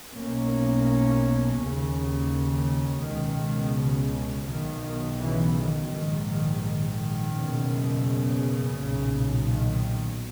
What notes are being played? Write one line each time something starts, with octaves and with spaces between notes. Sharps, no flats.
B1 B2 A#3 C#4
D#2 C#3
C#2 B2 D#3
C#3
B1 B2 D#3
D#3
C#3 E3
D#3
A#1 G#2 D#3
D#3
D#3
F#1 E2 B2
C#3
B1 A#2
D#3